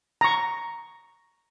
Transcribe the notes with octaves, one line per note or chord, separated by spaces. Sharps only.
A#5 C#6